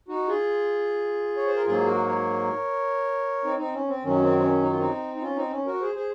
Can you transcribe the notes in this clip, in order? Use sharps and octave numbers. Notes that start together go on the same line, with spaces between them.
D#4 F#4
F4 G#4
C#5
C5
A#4
G#2 F#3 A#3 F4 G#4
F#4 A#4
A#4 C#5
C4 D#4
C4 D#4
C#4
C4
F#2 D#3 F#3 C#4
C4
C4
C#4
D#4
F4
C4 D#4
D#4
C#4 F4
C4 D#4
C#4
F#4 A#4
G#4 C5
G#4 C5